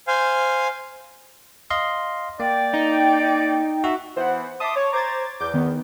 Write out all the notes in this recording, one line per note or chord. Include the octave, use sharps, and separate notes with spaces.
C5 F5 G#5
D#5 F5 C6
A#3 D5 G5
D#4
F#4 E5
E3 B3 C5 F#5
E5 A5 C6 D6 D#6
C#5
C5 A#5 D6 G#6 A6
E2 D6 G6
D#3 B3